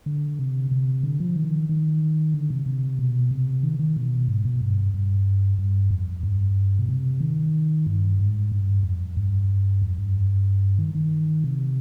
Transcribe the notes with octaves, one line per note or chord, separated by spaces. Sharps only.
D3
C3
C3
D3
F3
D#3
D#3
D3
C3
C3
B2
C3
D#3
D#3
B2
G#2
B2
G2
G2
G2
F2
G2
B2
C3
D#3
G2
G#2
G2
F2
G2
F2
G2
D#3
D#3
C3